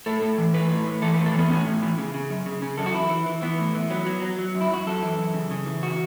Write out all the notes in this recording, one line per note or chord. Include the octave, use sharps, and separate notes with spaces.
A2 A4
A2
E3
A2 B4
A2
A2
E3 A4
B4
A2
A4
E3 B3
A2 C#4
A2
E3
C#3
C#3
F#2
C#3
C#3
F#2 A4
F#4
E3 E4
E3
E3
E3 B3
A2
E3
F#3 B3
F#3
F#3
F#3
F#2
E4
F#2 F#4
F#2 A4
E3
F#2
C#3
C#3
E3
F#4